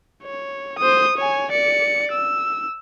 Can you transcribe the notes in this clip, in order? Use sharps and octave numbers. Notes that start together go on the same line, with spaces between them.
C#5
C5 D#6
C#5 G#5
D5 C#7
E6